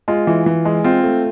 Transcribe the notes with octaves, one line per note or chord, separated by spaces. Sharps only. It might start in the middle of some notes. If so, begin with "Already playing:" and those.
G#3 F4
E3
E3
G#3
C4 F4
A3